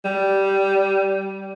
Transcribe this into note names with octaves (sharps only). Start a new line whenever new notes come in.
G3